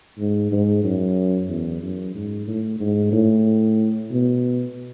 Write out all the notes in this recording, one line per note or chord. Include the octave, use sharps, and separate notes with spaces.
G#2
G#2
F#2
E2
F#2
G#2
A2
G#2
A2
B2